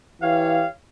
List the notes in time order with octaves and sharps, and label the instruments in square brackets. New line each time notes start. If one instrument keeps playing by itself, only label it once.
[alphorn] E3 [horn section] G4 C#5 F5